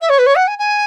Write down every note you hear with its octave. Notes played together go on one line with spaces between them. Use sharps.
E5
C#5
B4
C#5
F#5
G#5
G#5